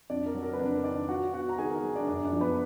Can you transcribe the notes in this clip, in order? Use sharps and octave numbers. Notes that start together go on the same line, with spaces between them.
F2 D4 D5
A#4
F#3
A#4
B4
F2 D4 D5
D#3 D4 D5
F4 F#4 F#5
B3 F#4 F#5
A#5
D#3 G#4 G#5
A#4 A#5
F#3
D4 D5
F#2 D4 D5
D4 D5
F3
B3 B4